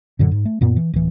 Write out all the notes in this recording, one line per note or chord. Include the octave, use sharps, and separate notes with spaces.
F#2 A#2 D3 F#3
G#2
A3
F#2 A#2 B3
E3
D1 E3